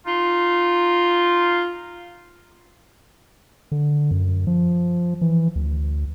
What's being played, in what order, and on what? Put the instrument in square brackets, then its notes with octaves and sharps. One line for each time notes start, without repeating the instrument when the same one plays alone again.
[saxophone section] D#4 F4
[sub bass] D3
F#2
F3
E3
D2